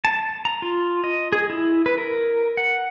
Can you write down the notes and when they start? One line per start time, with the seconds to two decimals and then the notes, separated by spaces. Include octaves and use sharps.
0.05 A5
0.45 A#5
0.62 F4
1.04 D#5
1.32 G#4
1.50 E4
1.86 B4
1.98 A#4
2.57 F#5